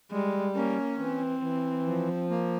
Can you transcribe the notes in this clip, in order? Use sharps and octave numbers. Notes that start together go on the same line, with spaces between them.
G3 G#3
A#3 C#4
E3 C4
E3
F3
A#3